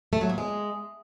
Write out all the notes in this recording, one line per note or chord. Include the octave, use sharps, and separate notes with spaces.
A3
F#3
A#2
G#3